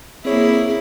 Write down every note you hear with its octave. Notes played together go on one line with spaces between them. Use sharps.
A#3 C4 E4 G#4 C#5